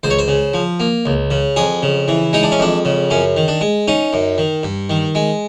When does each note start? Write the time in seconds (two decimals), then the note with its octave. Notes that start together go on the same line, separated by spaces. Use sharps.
0.03 C#2 C5
0.10 C#5
0.19 C5
0.28 C#3
0.54 F3
0.80 A#3
1.06 C#2
1.31 C#3
1.56 F2 G#4
1.83 C#3
2.08 E3
2.33 G#3 D#4
2.43 D4
2.52 C#4
2.59 F2 D4
2.85 C#3
3.10 F#2 C#4
3.37 D#3
3.48 D4
3.61 G#3
3.88 C#4 D#4
4.13 F#2
4.38 D#3
4.63 G2
4.90 D#3
5.15 G#3